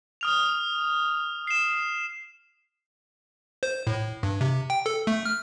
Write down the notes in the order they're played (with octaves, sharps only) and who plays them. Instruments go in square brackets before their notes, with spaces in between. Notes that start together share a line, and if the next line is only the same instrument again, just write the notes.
[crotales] D#6 F6 F7
C7 E7
[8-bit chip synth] C5
A2
G2
C3
G5
A4
A3
F6